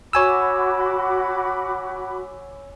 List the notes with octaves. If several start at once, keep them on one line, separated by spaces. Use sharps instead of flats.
F#4 C#5 G#5 B5 D6 E6